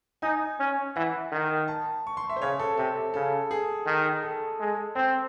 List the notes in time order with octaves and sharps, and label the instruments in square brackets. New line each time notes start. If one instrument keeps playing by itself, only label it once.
[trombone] D#4 [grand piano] G#5
[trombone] C#4
[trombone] E3 [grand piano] F#5
[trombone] D#3
[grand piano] A5
C#6
C6
E5
C5
[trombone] C#3 [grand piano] C#5
[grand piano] A4
[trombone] C3 [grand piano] A4
[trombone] C#3 [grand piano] A4
[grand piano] G#4
[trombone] D#3
[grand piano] A4
[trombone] G#3
[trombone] C4 [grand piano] C5